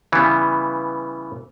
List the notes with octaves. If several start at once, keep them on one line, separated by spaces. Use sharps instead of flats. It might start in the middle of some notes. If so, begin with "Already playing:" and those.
C#3 E3 G3 B3